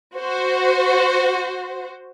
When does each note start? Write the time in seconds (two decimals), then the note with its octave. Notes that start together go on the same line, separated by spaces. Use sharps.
0.16 F#4 C5